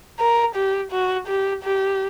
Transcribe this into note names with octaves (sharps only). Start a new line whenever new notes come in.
A#4
G4
F#4
G4
G4